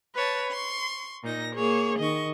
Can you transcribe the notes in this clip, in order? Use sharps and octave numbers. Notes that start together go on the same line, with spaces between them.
B4 C#5 A5
C6 C#6
A#2 D#4 A#6
A#3 G#4 C#5
D#3 D#5 C#6